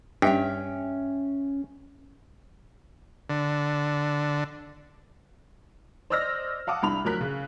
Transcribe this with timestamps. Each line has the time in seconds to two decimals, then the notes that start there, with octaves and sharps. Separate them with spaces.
0.22 G2 C#4 E5 G5
3.30 D3
6.10 C5 D5 D#5 E6 F6 A#6
6.67 F5 F#5 A5 D6 D#6
6.83 C2 D4 B5 F7
7.04 D2 F3 F#3 A#4 F#6 B6
7.21 C#3